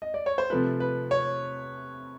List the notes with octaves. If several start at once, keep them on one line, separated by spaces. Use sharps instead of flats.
D#5
D5
C#5
C5
C3 F3 A3 B4
B4
C#5